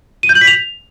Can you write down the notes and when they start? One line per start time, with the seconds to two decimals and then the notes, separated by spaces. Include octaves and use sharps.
0.23 D#7
0.29 G6
0.35 F#7
0.41 B6
0.47 F7